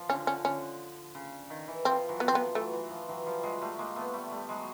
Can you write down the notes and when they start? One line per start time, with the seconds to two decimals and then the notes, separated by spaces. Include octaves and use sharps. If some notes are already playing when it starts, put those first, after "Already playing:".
Already playing: F3
0.09 D3 C#4
0.26 D3 C#4
0.45 D3 C#4
1.15 C#3
1.50 D#3
1.68 E3
1.85 F3 C4
2.09 E3 F#3
2.20 B3
2.28 C4
2.33 F3 B3
2.55 E3 F#3 A3
2.73 E3 F#3
2.90 F3
3.08 E3 F#3
3.26 F3 G3
3.43 F#3 G#3
3.61 G3 A3
3.79 G#3 A#3
3.96 A3 B3
4.14 G3 A3
4.31 G3 A3
4.49 F#3 G#3